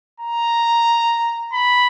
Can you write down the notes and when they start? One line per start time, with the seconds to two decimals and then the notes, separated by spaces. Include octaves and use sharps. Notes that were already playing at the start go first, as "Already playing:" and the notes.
0.20 A#5
1.53 B5